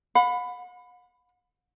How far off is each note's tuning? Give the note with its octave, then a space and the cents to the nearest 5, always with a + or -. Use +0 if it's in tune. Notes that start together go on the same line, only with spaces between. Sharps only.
F#5 -40 B5 +15